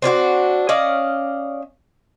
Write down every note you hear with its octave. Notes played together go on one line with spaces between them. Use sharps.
C4 D4 F4 F#4
C#4 D5 D#5 F5